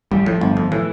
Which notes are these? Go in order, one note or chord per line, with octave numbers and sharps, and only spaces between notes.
A1 G3
A2 F3
G1
F2
A2 E3